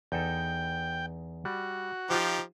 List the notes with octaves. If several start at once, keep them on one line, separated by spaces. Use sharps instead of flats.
E2 D#4 A4 G5
G3 F#4
F3 D#4 F4 G4 C5